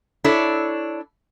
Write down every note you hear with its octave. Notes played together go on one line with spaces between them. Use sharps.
D4 E4 A4 C#5